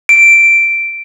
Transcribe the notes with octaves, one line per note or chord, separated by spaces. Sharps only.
D7